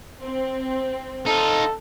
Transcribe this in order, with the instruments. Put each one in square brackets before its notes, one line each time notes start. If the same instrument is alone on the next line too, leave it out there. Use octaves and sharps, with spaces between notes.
[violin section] C4
[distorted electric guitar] D#4 F4 [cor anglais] A4